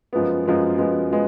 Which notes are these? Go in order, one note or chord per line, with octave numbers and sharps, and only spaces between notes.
F#2 F3 G#3 B3
F#2 F3 G#3 B3
F#2 F3 G#3 B3
F3 G#3 B3